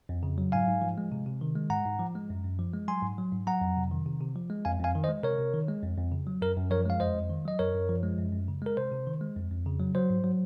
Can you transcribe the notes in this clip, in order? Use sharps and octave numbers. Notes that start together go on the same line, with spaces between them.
F2
C#3
F#3
G#2 F5 G#5
G#2
F3
G#3
C3
C3
D#3
G#3
G#2 F#5 A#5
G#2
F3
G#3
F#2
F#2
F3
G#3
F#3 G#5 C6
G#2
F#3
G#2
F#3 F#5 A#5
F2
C3
D#3
C3
C3
F3
G#3
F2 F5 G#5
F2 F5 G#5
D#3
C5 D#5
G#3
C3 A#4 C#5
C3
D#3
G#3
F2
F2
C#3
F#3
F#2 A#4
F#2
F3 A#4 C#5
G#3 F5
F2 C5 D#5
F2
D#3
F#3 D#5
F#2 A#4 C#5
F#2
F3
G#3
F#2
F#2
C#3
G#3 A#4
C3 C5
C3
D#3
G#3
F2
F2
C#3
F#3
F#3 C5
G#2
F#3